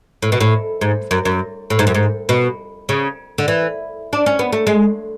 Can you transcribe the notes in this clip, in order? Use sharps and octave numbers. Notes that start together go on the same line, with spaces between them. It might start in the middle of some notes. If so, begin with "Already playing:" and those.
A2
B2
A2
G#2
F#2
F#2
A2
G#2
F#2
G#2
B2
C#3
D3
E3
D4
C#4
B3
A3
G#3